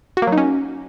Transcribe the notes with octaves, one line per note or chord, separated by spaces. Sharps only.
F#4
A#3
F#3
D#4
C#4